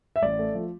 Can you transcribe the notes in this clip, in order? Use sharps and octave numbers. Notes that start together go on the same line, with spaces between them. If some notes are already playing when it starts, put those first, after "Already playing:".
E5
A1 D5
A3
F3